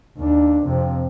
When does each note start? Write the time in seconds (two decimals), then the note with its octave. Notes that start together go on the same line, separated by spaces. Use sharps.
0.18 D#2 D4
0.64 F2 C3